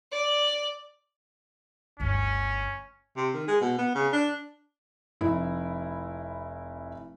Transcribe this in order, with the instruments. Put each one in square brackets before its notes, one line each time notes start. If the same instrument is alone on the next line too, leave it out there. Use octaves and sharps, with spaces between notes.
[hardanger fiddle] D5
[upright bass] G1 D2 [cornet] C#4
[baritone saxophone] C3
D#3
G#3
B2
B3
C#3
D4
[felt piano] F1 E4